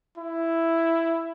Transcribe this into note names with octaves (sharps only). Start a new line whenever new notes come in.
E4